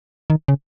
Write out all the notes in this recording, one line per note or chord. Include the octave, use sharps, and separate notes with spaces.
D#3
C#3